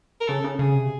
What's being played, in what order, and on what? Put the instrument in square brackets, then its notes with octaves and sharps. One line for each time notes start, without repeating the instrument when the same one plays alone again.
[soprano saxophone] A#4
[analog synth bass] C#3 [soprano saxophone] A4
[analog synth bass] C#3
[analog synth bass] C#3 [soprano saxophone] G#4
[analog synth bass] C3